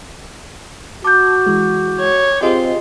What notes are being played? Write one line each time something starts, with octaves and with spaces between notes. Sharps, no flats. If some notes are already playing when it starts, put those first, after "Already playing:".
F#4 A5 D6 G6
E3 G#3
C#5
C4 F4 G4 G#4 D#5